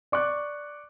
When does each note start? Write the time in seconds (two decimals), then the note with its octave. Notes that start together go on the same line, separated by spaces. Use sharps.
0.12 D5 C#6 D6 F#6